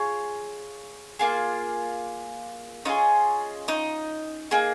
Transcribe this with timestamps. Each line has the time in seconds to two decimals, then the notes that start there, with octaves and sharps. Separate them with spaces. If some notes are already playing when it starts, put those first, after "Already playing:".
Already playing: F4 G#4 C#5
1.19 A#3 F4 G#4
2.85 C#4 D#4 F4 G#4 D#5
3.68 D#4 D#5
4.51 A#3 D#4 G#4